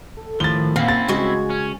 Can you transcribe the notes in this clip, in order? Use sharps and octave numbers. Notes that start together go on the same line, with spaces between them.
A4
A2 D#3 F3 A6 G7
A#2 C4 C#4 E4 F5
A#3 A6
C#3 G#3 F#4 G#6
C#4